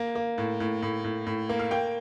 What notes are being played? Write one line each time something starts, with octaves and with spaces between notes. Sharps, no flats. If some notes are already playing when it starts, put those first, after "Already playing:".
Already playing: A#3
A#3
A2
A2
A2
A2
A2
A#3
F5
A#3 G5